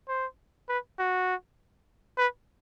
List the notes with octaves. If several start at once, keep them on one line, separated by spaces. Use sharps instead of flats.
C5
B4
F#4
B4